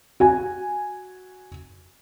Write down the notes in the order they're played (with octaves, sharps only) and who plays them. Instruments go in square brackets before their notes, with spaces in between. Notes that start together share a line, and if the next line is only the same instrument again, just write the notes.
[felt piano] F#4 G#5